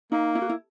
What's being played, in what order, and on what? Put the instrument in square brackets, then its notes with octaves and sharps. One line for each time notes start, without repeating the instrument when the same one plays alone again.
[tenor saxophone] A#3 [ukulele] D#4
[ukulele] E4
F#4
E4